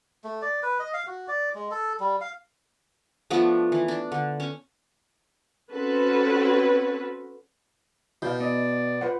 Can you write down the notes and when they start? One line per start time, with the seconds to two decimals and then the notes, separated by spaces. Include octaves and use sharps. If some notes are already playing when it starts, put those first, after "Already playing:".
0.24 A3
0.42 D5
0.63 B4
0.79 D#5
0.93 F5
1.07 F#4
1.28 D5
1.55 G#3
1.71 A4
2.00 G3
2.21 F5
3.30 F3 A3 B3 D4
3.72 E3
3.88 D4
4.12 D3
4.40 C#4
5.71 C4 C#4 F#4 A4 B4
8.22 B2 E4 D5 F5 G6
8.40 B3 D5 D#5
9.01 F4 B4 C5 F#5